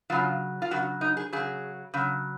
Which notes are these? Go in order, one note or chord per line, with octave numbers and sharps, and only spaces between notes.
C#3 F#3 F4
F4
C#3 F#3 F#4
D#4
G#4
C#3 F#3 G#4
C#3 F#3